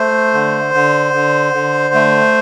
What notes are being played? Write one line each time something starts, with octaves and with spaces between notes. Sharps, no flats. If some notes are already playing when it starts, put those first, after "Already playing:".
Already playing: A3 C5
D3
D3
D3
D3
A3